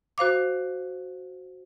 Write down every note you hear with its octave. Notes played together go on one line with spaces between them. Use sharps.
F#4 C5 F5 D6